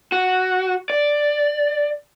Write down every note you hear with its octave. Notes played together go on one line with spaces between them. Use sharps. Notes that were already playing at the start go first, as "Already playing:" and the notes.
F#4
D5